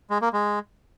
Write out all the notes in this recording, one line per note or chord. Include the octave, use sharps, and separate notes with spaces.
G#3
A#3
G#3